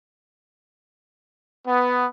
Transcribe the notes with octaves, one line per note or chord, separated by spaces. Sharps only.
B3